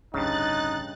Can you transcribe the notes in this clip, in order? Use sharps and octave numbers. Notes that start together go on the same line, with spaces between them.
A1 D2 G2 C#3 D#4 F#6 A6